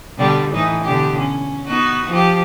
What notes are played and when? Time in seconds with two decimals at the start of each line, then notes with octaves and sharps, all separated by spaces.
0.18 B2 D3 G3
0.52 A2 E3 D#4
0.84 B2 D3 G4
1.19 C#4
1.68 B3 D#4 F#4
2.10 F3 G4